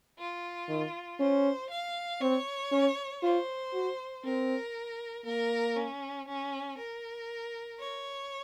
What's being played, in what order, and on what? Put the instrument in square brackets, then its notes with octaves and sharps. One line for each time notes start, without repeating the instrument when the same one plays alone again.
[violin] F4
[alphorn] D#3
[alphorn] C#4 [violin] C5
[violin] F5
[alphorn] C4 [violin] C#5
[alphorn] C#4
[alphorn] F4 [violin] C5
[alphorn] F#4
[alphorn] C4 [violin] A#4
[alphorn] A#3 [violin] A#4
[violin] C#4
C#4
A#4
C#5